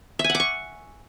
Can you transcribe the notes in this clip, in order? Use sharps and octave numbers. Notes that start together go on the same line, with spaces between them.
E5
G#5
F#5
D6
C#6